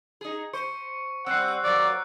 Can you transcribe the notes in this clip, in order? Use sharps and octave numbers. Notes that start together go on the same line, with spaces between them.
D#4 G#4
C5 C#6 C#7
G3 C4 F#5 E6 F#6 C7
F#3 A#3 D5